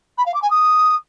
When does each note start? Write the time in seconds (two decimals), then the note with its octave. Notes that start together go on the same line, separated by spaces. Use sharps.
0.18 B5
0.26 F5
0.34 D6
0.42 G#5
0.50 D#6